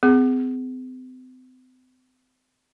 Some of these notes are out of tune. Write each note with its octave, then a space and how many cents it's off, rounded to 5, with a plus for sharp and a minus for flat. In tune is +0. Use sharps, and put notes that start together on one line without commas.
C4 -40 G#4 +0